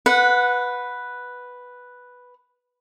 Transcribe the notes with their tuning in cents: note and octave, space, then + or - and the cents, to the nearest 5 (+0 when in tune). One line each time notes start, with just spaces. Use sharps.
B4 +0 F#5 -20